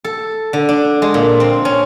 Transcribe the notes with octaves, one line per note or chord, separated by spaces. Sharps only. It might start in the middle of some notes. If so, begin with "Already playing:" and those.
A4
D3
D4
G#3
A#2
C4
C#4